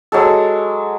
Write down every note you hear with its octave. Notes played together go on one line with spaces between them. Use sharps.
F#3 G#3 A4